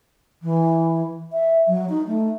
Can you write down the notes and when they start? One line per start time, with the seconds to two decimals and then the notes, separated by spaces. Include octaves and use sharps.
0.42 E3
1.32 E5
1.67 F#3
1.89 D#4
2.06 A3